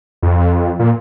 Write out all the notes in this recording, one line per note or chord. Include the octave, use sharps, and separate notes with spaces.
F2
A#2